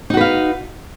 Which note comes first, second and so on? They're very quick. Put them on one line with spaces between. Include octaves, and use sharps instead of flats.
D#4 F#4 B4 F5